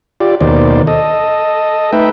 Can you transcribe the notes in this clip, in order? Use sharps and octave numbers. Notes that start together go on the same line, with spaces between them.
F4 G4 D5
D#2 B2 D#3 C5 D5
A4 D#5
A3 D#4 B4 E5 G5